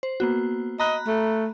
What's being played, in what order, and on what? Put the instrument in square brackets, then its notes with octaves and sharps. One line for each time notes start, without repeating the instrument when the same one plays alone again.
[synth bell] C5
A#3 B3 F#4
[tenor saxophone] D#5 [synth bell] A#5 B5 F#6
[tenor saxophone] A3